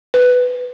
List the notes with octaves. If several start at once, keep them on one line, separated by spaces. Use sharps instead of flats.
B4